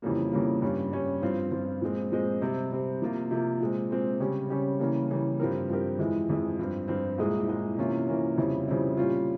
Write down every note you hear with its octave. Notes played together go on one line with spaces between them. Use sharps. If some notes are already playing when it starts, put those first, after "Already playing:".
F2 C#3 E3 G3 A#3
F2 C#3 E3 G3 A#3
G2 G3 C#4
G2 G3 C#4
G2 F3 C4 F4
G2 F3 C4 F4
A#2 F3 G#3 C4
A#2 F3 G#3 C4
C3 G3 C4
C3 G3 C4
C3 F3 A#3 F4
C3 F3 A#3 F4
A#2 G#3 C4
A#2 G#3 C4
C#3 G3 C#4 G4
C#3 G3 C#4 G4
C#3 E3 G3 A#3
C#3 E3 G3 A#3
G2 F3 C4 G4 A#4
G2 F3 C4 G4 A#4
F2 E3 G#3 E4
F2 E3 G#3 E4
G2 F3 C4
G2 F3 C4
C2 A#2 G#3 E4 G#4
C2 A#2 G#3 E4 G#4
C3 E3 A#3 C#4 F4
C3 E3 A#3 C#4 F4
F2 C#3 G3 C4 E4
F2 C#3 G3 C4 E4
A#2 G3 C#4 F4